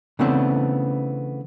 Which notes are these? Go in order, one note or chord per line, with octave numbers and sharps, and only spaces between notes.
C#3 E3 A3 B3 C4 D4